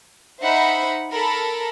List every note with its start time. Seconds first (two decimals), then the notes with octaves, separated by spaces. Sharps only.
0.42 D#4 C5 E5 F#5 B5
1.11 A4 A#4 B5